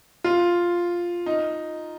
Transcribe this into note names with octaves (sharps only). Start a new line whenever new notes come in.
F4
D#4